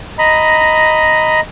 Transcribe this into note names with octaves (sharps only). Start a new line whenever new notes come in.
D#5 A#5 B5